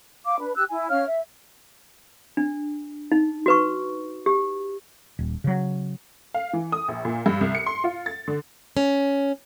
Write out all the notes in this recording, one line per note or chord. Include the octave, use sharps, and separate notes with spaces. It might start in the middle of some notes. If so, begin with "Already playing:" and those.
F5 D6
D4 B4
G4 E6 F#6
E4 G#5
C#4 C#5 F5 F6
E5
D4
D#4
F#4 B4 C#6
G4
D#1
C#3 F#3
F5
E3
D#6
A#1
A#2
G2
C2
C#7
C6
F4
A6
D3
C#4